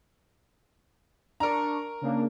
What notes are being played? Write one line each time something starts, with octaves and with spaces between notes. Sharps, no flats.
D4 A#4 A#5 C#6
C#3 A#3 D4